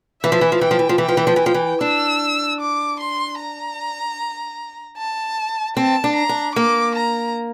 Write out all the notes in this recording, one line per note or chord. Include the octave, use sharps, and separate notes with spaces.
E3 E5
F3
E3
F3
E3 G5
F3
E3
F3
E3 G5
F3
E3
F3
E3
F3 G5
E3
D4 E6
D6
C6
A#5
A5
C4 A5
D4
A#5
D4
A#3 D6
A#5